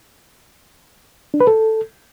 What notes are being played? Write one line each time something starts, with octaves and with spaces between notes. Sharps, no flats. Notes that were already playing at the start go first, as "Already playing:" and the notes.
D4
B4
A4